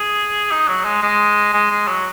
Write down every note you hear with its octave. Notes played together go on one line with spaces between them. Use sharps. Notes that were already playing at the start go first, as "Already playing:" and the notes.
Already playing: G#4
D#4
F#3
G#3
G#3
G#3
G#3
F#3